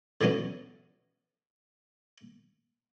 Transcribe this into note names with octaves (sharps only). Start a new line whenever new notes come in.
D3 E3 F#3 B3 C#4